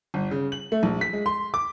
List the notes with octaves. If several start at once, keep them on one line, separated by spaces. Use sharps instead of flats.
G1
C#3
F#7
A3
A#1
B6
G#3
C6
D6